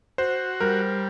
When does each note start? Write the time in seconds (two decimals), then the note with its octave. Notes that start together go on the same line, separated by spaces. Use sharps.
0.18 F#4 C5
0.60 G3 A#4